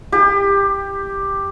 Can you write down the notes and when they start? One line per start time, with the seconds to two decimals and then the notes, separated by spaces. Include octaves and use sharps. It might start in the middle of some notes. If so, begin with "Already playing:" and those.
0.12 G4